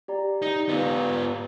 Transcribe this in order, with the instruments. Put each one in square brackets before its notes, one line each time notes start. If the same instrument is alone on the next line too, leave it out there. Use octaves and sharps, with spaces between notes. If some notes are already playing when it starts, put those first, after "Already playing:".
[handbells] G4 D5 A#5
[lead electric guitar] D#4
B3 F4